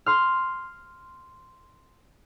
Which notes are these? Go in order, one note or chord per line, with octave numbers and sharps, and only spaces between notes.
C6 F6